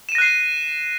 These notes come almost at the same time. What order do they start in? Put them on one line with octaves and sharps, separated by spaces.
E7 D#7 A#6 F#6 C7